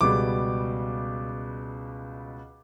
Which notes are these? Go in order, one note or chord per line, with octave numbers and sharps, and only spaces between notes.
C#2 B2 G3 D6